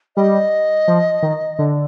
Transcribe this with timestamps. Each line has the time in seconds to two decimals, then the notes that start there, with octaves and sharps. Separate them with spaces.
0.16 G3 D#5
0.88 F3
1.23 D#3
1.59 D3